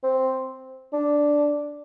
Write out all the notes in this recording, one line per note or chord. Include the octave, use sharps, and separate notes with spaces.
C4
D4